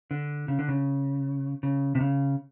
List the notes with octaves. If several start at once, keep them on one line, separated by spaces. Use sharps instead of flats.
D3
C#3
D3
C#3
C#3
C3
C#3